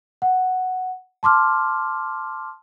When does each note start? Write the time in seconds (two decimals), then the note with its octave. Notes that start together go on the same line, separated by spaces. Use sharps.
0.22 F#5
1.23 A5 C6 D6 F6